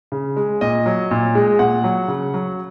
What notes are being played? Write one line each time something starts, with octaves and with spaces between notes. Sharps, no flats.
C#3
G#3
A#2 D#5
F#3
A#2
G#3
A#2 F#5
F#3
C#3
F#3